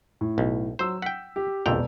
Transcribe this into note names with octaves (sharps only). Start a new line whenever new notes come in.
A2
B1
F#3 C5 E6
F#5 G5 B6
G4
E1 A#1 F2 G5 E6 F7